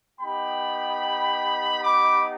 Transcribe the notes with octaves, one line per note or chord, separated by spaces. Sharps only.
B3 D#4 G4 G5 B5
B5 D6